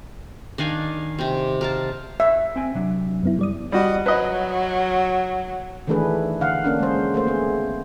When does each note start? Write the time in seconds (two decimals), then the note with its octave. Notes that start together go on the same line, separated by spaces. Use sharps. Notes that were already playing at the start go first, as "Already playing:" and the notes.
0.58 D#3 D4 F5 G#5
1.19 C3 C4
1.61 A#4 F5 A5
2.20 E5
2.56 C4 G5 G#5
2.75 C3 F#3 D4
3.23 F#2 B3 E4
3.39 G3 D5 D#6
3.72 G3 F#4 D#5
4.06 F#3 B4 D#5
5.87 D#3 E3 A3 D4 G#4 B4
6.41 D3 F5 F#5
6.64 A#3 C#4 D4
6.79 G#3 C5
7.14 A3 A#3 C5
7.27 B3 G#4